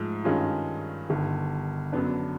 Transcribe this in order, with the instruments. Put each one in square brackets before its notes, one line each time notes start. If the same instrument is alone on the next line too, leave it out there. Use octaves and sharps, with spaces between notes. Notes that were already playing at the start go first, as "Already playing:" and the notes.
Already playing: [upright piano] G#2 F3 A3
G2 D#3 G#3 C#4 F4
G1 G2 D#3
F#2 D3 F#3 B3 D4